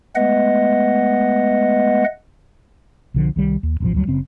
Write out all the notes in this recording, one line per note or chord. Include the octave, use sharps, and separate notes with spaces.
G#3 A3 B3 B4 D#5 F#5
B1 D3 F3
C2 D#3 G3
D#2
E1 A1 F3
D2 F#3 G3
F#1 C#3 C4